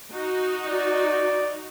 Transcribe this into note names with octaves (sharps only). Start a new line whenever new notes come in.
D#4 F#4
D5